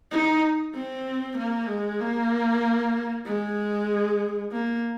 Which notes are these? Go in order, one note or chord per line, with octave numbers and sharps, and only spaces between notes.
D#4
C4
A#3
G#3
A#3
G#3
A#3